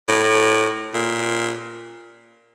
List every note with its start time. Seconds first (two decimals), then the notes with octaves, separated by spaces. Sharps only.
0.08 A2
0.94 A#2